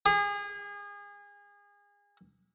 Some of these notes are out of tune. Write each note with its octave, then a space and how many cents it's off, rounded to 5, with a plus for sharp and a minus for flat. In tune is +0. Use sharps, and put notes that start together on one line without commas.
G#4 -30